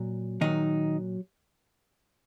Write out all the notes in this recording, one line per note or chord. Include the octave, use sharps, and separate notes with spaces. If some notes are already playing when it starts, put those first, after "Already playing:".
Already playing: A#2 F#3
A#2 D#3 F#3 D#4